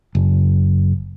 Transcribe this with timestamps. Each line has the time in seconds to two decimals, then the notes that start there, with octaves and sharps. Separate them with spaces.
0.15 F#1